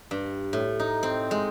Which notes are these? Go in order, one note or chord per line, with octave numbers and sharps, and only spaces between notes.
G2
A2
D#4
C4
G#3